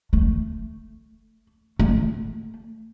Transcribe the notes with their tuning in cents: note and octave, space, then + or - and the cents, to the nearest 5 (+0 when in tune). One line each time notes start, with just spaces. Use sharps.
A3 +15
A3 +15